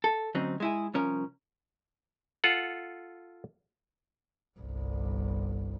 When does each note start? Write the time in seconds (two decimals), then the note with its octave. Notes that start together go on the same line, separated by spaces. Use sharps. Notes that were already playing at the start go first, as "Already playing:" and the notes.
0.04 A4
0.35 D2 F#3 C4 C#4 D#4
0.60 G#3 E4 G#4
0.94 C2 F3 C#4 A#4
2.44 F4 A4 F#5
4.60 G1 C2